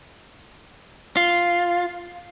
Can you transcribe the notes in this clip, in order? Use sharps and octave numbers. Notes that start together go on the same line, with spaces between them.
F4